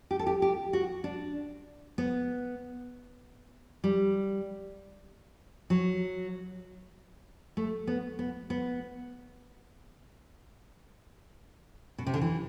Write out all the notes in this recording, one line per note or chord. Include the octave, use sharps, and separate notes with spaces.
G4
A4
G4
G4
F#4
D4
B3
G3
F#3
A3
B3
B3
B3
B2
C3
D3
E3